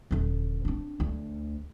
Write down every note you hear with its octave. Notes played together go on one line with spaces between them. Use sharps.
D#1 D3
C4 D4
D2